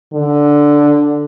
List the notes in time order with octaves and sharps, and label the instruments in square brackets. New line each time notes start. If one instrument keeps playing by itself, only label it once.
[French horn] D3